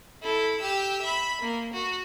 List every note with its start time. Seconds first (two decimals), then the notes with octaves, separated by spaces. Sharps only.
0.22 E4 A4
0.60 G4 E6
1.01 E5 B5
1.41 A#3
1.73 F#4